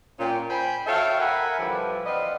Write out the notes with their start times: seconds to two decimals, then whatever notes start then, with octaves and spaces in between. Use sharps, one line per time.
0.19 A#2 C#4 G5
0.49 C5 G5 G#5 B5
0.87 F#4 A4 C#5 E5 F5 G5
1.19 A4 A#4 E5 F#5 G#5 B5
1.59 A2 D3 E3 F3 G3
2.06 C4 B4 D5 D#5 F5 F#5